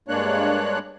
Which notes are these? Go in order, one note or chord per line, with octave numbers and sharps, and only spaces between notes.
G2 G#3 A#3 D4 C#5 F#6